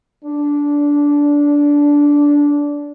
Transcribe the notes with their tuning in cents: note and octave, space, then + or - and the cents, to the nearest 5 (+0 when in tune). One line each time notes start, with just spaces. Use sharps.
D4 -15